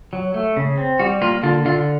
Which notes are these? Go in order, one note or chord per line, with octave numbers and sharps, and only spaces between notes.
F#3
A3
C#3
C4
G3 F#4
A#3 F4
D3 F4
D3 F4